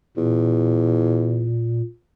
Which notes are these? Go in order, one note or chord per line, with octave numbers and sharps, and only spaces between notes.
E2 A#2